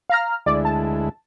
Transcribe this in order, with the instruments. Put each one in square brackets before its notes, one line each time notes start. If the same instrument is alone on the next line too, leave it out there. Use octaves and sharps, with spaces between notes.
[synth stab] F5 A#5 F6
[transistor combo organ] D2 G#3 E4 [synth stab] D5
[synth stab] A5